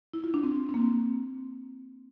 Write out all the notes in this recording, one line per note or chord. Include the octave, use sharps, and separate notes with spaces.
E4
F4
D4
C4
C4
A#3